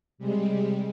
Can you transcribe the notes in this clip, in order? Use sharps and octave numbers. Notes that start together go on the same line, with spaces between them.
C3 G3 G#3